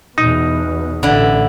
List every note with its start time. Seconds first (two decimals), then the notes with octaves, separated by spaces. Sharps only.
0.18 E2 B2 D#4
1.03 A1 D3 E4